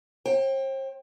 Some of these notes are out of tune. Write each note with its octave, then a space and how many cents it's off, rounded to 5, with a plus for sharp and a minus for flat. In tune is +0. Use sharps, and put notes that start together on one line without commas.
C5 +45 G5 +0